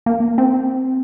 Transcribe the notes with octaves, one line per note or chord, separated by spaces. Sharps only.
A#3
C4